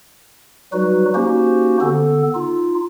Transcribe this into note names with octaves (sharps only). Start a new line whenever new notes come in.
F#3 G3 D#4 F#4 B4
A#3 C#4 D#4 F#4 G4 C5
D3 B3 A4
D#4 F4